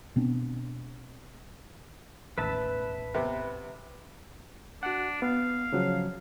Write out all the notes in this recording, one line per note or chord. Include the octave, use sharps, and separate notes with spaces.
B2 B3 C4 D4
E1 A1 D#2 B4 E5 A5
C3 B3
D4 F#4 F#5
B3 F5
C#3 F3 F#3